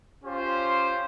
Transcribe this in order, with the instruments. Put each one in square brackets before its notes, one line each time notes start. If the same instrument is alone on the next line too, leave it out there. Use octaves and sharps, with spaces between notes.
[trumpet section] C#4 F4 G4 C5